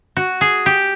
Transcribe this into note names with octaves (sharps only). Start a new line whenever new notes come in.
F#4
G#4
G4